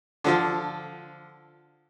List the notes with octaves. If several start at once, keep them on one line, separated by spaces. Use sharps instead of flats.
D3 F3 F4